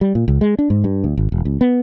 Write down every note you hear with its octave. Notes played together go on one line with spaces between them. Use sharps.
G3
A#2
C#2
G#3
D4
G#2
G2
D2
G#1
E1
C#2
B3